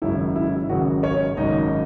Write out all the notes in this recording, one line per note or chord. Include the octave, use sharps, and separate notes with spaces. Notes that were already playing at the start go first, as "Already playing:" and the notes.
G#1 F#2 C#3 E4
E4
G#1 F#2 C#3 F#4
C#4 C#5
G#1 F#2 C#3 D#4 D#5